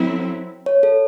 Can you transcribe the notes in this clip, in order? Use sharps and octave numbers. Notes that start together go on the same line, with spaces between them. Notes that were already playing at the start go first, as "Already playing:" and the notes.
Already playing: F#3 C4 E4 A4
C#5
A4